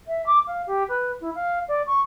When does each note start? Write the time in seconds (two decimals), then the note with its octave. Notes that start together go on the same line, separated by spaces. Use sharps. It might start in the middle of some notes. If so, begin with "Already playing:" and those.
0.07 E5
0.26 D6
0.47 F5
0.66 G4
0.88 B4
1.20 E4
1.35 F5
1.68 D5
1.86 C#6